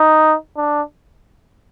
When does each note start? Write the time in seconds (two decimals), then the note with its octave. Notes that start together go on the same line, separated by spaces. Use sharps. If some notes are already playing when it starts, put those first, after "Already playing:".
Already playing: D#4
0.57 D4